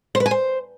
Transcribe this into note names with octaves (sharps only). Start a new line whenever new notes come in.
C5
B4
G#5
C5